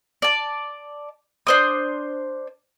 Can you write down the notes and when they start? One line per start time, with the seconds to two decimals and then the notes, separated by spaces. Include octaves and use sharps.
0.22 D5 A5
1.47 D4 C5 D#6